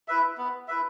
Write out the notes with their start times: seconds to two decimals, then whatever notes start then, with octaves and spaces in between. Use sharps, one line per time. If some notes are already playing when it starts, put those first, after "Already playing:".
0.08 E4 B4 E5
0.38 B3
0.68 E4 B4 E5